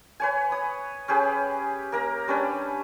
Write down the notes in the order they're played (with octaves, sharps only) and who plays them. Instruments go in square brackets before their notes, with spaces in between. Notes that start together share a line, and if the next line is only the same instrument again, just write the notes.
[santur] B4 C#5 G#5
D#6
C#4 G4 G#4 B4
A#3 A#4 A#5
G3 C#4 D4 B4